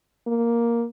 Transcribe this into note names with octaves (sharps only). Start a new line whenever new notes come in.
A#3